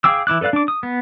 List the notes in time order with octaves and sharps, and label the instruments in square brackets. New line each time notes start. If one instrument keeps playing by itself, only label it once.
[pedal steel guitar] G#4 F5 G5 D6 E6
E3 E4 D6 F#6
A4 B4 D5 F5 F#6
D4 D6
D#6
B3